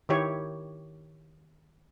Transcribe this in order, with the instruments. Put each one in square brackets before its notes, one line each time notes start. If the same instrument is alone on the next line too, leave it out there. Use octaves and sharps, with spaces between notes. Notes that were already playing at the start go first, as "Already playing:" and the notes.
[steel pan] D#3 E4 G4 C#5